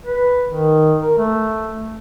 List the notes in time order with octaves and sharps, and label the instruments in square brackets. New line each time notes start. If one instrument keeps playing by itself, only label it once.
[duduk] B4
D#3
A#4
A3